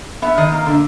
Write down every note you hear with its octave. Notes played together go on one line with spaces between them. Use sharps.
B3 E5
D#3 D#5
A#3
D3